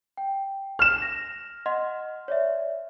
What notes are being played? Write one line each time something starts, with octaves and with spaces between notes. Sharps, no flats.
G5
F6 E7
A#6
D#5 F#5 C6
C#5 D5 E5